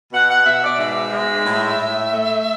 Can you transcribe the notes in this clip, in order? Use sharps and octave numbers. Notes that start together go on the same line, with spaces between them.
B2 F#5
F#5
B2 E5
D5
G#2 E5
G#3
A2
A2
A3